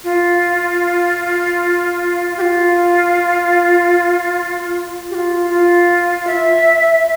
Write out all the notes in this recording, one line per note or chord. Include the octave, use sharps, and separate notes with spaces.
F4
G4
F4
G4
F4
F4
E5